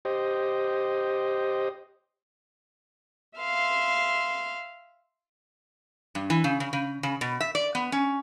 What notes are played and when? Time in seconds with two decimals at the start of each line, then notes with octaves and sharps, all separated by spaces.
0.05 G4 C5 D#5
3.38 E5 F5 C6
6.15 G2
6.30 E3
6.44 C#3
6.60 C#3
6.73 C#3
7.03 C#3
7.21 B2
7.40 E5
7.55 D5
7.75 B3
7.92 C#4